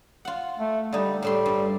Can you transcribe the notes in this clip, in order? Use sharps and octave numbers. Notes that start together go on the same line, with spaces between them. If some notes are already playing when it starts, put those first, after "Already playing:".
F4 F#5
A3
D3 G3 D#4
A2 G3 A3 C6
G2 F5